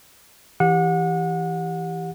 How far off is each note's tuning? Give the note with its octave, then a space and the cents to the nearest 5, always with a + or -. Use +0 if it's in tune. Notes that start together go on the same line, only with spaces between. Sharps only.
E3 +0 G4 +10 F#5 -30